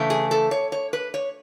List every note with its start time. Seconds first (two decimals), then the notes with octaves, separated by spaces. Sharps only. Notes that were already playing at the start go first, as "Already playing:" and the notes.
Already playing: C#3 E3 A3
0.10 G#4
0.31 A4
0.51 C#5
0.72 C#5
0.93 B4
1.14 C#5